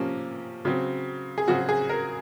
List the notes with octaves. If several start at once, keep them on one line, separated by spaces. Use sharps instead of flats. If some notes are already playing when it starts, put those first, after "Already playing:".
Already playing: C3 F3 A#3 C#4
C#3 F#3 C4
G#4
C#3 F#3 C4 F#4
G#4
A#4